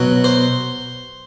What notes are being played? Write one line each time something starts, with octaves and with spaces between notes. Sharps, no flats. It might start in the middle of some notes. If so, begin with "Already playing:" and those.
Already playing: B2 F#3
C5